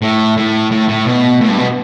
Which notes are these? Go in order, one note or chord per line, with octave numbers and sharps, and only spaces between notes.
A2
A2
A2
A2
B2
A2
G2
B2